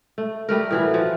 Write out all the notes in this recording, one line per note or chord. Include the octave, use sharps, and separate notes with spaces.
A3
G3 A3 A#4
A2 E3 F#4
F3